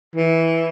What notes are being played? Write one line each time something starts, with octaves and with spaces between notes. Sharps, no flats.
E3